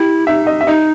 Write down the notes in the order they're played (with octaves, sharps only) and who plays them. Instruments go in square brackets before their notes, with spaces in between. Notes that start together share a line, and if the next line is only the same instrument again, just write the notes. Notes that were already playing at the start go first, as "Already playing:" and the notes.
Already playing: [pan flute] E4 [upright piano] G4
[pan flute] D#4 [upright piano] E5
[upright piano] D#5
E5
[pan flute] D#4 [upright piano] D#5